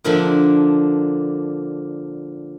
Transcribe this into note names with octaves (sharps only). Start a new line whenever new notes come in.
A#2 D3 F3 A#3 D4 E5